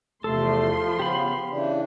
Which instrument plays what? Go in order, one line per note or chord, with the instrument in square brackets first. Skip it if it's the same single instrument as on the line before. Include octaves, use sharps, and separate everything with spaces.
[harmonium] E2 C3 A3 [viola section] F3 C6 [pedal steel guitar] A4
[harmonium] C#3 B3 [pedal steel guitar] G4 B5
[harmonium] C#3 E3 D4